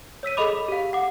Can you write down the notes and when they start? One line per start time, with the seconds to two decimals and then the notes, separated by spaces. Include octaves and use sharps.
0.23 C#5 E6 B6 D#7
0.37 G#4 A4 D#5 B5 D6
0.68 G4 F5
0.93 F#5 D6